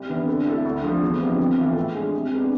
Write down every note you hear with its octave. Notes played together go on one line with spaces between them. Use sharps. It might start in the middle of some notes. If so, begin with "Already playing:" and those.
Already playing: C2
C3 E3 B3 D4
D3
A3 E4 A4
D2
D3 F3
E2
C3 F3 B3 D4
F2
E3 B3 F4 A4
A2
G#3 D4 G#4
C3
G#3 B3 D4